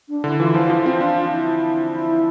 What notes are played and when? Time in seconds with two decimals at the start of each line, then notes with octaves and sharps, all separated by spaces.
0.09 D4
0.24 D3 E4
0.39 E3 F4
0.54 F3
0.70 F3 F4
0.79 E4
0.86 C4 F4
1.01 D4
1.32 E4
1.94 E4